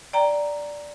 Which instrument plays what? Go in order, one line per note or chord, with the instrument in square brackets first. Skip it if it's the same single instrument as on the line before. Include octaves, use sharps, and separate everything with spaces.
[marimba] D5 G5 A#5